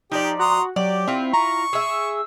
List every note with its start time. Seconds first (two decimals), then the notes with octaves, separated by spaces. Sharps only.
0.12 F3 D#4 G4 D5
0.39 F#4 A#5 C6 D#6
0.76 F#3 G4 D5
1.08 C4 E4 F4
1.34 A#5 C#6
1.73 G#4 E5 E6